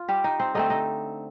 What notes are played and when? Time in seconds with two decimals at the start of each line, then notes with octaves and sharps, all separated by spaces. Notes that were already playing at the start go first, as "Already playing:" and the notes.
Already playing: F4
0.08 G3 G4
0.24 D#4
0.40 C4 C5
0.55 D3 A3 C4 D#4 D#5
0.70 D#4 D#5